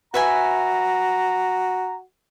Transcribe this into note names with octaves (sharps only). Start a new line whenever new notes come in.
F#4 B4 E5 G#5 A#5